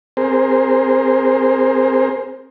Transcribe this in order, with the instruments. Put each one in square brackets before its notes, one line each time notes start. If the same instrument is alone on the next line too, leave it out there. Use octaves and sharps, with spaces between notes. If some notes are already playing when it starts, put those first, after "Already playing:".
[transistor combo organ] C4 G#4 A#4 C5